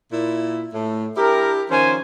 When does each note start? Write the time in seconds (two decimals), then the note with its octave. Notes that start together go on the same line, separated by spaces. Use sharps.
0.12 A#2 E4
0.74 A2 A3
1.17 D4 E4 G4 A#4
1.70 D#3 F3 C#4 C5 G#5